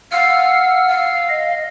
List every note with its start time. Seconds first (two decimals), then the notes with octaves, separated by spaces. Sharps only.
0.12 F5 F#5 E6 F6
0.89 F5
1.29 D#5